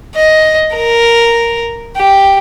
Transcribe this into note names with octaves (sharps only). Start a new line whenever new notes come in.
D#5
A#4
G4